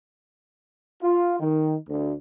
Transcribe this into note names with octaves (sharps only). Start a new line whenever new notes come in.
F4
D#3
D2